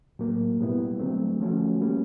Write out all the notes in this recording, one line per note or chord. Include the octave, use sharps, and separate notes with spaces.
A2 F#3 A#3
B2 G3 B3 E4
D3 F#3 A3 C4
F3 A3 C#4 F#4
G3 A#3 C#4